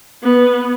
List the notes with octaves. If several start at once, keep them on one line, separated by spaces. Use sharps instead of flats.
B3